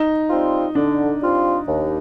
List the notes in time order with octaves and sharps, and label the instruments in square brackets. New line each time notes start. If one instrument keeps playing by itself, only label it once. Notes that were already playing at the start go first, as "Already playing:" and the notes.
Already playing: [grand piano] D#4
[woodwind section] G3 C4 F4
[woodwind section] D3 [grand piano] D4
[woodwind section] G3 C4 F4
D#2